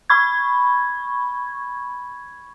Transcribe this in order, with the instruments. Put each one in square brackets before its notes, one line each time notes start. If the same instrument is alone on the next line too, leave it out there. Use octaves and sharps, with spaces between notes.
[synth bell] B5 C#6 G#6